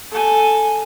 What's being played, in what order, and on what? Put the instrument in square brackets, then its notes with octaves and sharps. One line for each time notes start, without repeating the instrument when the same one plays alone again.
[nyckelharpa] A4 G#5